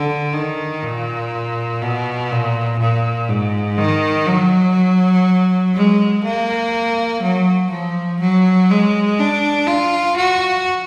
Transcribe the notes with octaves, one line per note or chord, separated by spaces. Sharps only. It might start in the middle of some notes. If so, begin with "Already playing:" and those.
Already playing: D3
D#3
A#2
B2
A#2
A#2
G#2
D#3
F#3
G#3
A#3
F#3
F3
F#3
G#3
D4
F4
F#4